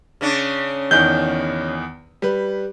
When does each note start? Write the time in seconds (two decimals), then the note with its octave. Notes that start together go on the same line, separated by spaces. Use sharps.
0.21 C#3 C#4 D4
0.91 E2 D#3 G6
2.22 G3 B4